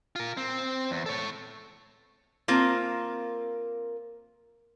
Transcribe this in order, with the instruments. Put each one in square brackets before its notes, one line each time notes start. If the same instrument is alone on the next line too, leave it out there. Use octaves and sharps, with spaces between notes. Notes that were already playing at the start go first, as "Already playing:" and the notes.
[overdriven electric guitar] F4 A#4
C4
E2
A4 C#5
[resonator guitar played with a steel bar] A#3 C4 F4 A#4